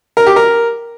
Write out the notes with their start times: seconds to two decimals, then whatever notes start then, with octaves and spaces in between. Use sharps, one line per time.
0.17 A#4
0.27 G4
0.36 A#4